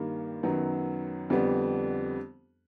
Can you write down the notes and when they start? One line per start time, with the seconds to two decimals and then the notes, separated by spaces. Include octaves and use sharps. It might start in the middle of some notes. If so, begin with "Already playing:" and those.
Already playing: G2 D#3 G3 A#3
0.43 F#2 D#3 F#3 B3
1.30 F2 D3 G3 B3 D4